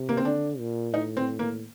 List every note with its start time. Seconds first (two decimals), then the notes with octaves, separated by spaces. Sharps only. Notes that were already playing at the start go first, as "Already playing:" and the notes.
Already playing: C3
0.09 A#3
0.17 C4
0.24 D3 D4
0.59 A#2
0.94 A2 D#4
1.17 C4
1.39 A#3